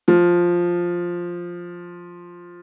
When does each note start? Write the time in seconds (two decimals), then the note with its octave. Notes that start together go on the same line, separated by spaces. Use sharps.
0.08 F3